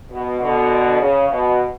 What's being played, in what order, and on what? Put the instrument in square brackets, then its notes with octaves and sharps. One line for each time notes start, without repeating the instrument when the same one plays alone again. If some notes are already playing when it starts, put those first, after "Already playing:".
[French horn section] B2
B2 D3
C#3
B2